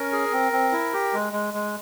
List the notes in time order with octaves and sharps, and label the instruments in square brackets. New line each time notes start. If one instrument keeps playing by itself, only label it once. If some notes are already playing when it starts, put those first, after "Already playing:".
Already playing: [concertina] C#4 A#4
G#4
C4
C4
E4
G4
G#3
G#3
G#3